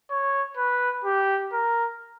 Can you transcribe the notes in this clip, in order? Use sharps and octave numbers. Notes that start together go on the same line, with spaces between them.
C#5
B4
G4
A#4